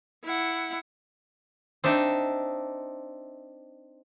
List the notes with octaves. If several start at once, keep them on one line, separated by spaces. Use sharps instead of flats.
E4 F#5
C4 D4 D#4 E5